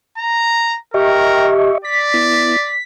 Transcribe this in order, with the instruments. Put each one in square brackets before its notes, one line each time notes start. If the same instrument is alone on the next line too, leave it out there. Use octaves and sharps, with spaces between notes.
[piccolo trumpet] A#5
[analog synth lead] G4 [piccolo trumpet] A#4 [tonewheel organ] D#5 E5 C#6
[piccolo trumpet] D5 [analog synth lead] B6
[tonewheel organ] B3 E4